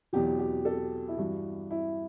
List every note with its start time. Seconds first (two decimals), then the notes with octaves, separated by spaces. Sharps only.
0.13 E2 B2 F#3 G4
0.39 G4
0.65 A4
1.08 E4
1.18 G2 E3 F#4
1.71 E4